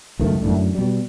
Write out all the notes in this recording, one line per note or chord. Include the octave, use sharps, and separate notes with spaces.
C#2 F#2 D#3 A3
F#2 A2 D3
B2 G3